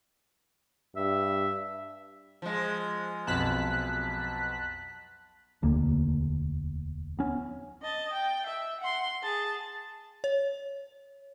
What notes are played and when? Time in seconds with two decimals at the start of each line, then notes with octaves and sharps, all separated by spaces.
0.96 G2 E5
2.42 F3 G#3
3.27 B1 F2 A5 F#6 B6
5.62 E1 D2 A#3
7.19 B3 C#4
7.82 D#5 A5
8.13 G5
8.47 E5
8.80 F#5 C6
9.23 G#4 A5
10.24 C#5